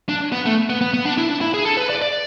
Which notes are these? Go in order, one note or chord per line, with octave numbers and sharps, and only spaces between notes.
D4
B3
A3
B3
B3
B3
D4
E4
D4
E4
G#4
A4
B4
D5
D5